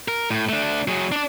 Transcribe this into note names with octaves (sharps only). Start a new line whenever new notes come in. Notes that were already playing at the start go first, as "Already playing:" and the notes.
A#4
A2
A3 D4
F#3 G#4
D4 D5